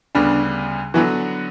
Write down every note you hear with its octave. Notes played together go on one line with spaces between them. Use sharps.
D2 C#3 G3 B3 D4
D3 E3 F#3 B3 F#4